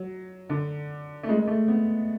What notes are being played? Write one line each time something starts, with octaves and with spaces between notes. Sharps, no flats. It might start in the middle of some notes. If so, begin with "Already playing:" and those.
Already playing: F#3
D3
A3
G#3
G#3
A3
B3